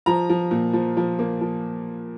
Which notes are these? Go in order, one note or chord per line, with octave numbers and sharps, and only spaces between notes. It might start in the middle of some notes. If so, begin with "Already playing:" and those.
F3 A#5
F3
A#2
F3
F3
A#3
F3